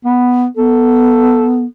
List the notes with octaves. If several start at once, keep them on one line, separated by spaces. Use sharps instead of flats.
B3
B3 A4